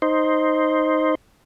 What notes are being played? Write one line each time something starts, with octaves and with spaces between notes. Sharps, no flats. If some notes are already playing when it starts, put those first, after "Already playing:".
D#4 C5